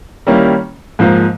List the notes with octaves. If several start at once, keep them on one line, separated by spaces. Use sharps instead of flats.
D#3 G3 A#3 C#4 E4
G#2 F3 A#3